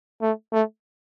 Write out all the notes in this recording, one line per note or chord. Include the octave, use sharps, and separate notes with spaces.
A3
A3